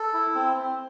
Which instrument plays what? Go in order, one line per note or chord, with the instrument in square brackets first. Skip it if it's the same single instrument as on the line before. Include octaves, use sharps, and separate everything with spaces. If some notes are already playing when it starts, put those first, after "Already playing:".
Already playing: [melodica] A4
E4
C4
C4